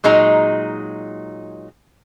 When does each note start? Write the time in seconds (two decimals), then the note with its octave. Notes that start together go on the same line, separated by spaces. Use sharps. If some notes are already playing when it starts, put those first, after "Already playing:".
0.04 A#2 F#3 G#3 D#4 A#5